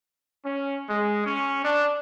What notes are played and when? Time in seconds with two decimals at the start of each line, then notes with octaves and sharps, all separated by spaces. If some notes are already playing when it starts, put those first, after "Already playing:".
0.45 C#4
0.89 G#3
1.24 C#4
1.64 D4